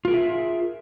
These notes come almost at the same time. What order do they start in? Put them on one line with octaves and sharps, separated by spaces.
F4 A#4 G#4 E5